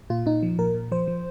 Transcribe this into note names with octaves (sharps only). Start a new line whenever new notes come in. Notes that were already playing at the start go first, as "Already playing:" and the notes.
A#2 F4
A#2 D#4
F3
A#2 A#4
A#2
F3 C5
F3